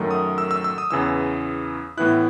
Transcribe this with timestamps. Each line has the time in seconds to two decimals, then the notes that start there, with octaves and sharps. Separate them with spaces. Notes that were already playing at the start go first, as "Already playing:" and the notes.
Already playing: F#2 D#3 F#3 A3
0.11 D#6
0.38 E6
0.51 E6
0.64 E6
0.78 D#6
0.91 E2 C#3 E3 E6
1.97 A2 E3 B3 E4 F#6